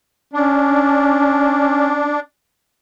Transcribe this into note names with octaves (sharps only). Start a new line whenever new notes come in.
C#4 D4